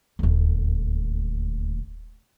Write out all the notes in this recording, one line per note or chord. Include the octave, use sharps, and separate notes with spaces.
D#1 D2